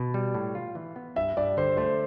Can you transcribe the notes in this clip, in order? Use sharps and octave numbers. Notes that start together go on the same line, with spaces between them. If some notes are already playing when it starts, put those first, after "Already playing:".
Already playing: B2
G3
A2
F4
E3
B3
G2 E5
G2 D5
D3 C5
A3 C5